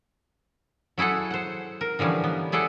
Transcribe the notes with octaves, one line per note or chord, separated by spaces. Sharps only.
F#3 E4 G#4 A4 F#5
C5 F#5
A#4
D3 E3 F3 G3 C#4
B3
E4 G#4 A4 D5 F#5